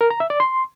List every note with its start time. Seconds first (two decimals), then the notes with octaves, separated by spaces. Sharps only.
0.01 A#4
0.10 A#5
0.20 E5
0.30 D5
0.40 C6